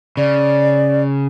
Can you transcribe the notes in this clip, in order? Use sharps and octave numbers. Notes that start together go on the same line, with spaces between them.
C#3 D5